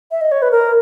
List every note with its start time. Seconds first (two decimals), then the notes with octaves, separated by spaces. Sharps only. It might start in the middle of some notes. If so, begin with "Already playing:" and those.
0.11 E5
0.21 D#5
0.32 C#5
0.42 B4
0.51 A#4